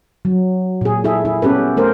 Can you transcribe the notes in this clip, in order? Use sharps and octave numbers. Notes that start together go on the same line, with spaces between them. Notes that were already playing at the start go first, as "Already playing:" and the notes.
F#3
A#2 G#4
E4 G#4 A4 E5
E4
B3 C#4 G4 A4 B4
A3 A#4 C5